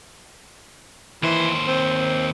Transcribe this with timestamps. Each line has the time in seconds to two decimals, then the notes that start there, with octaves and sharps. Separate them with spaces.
1.23 D#2 E3 C5
1.68 C4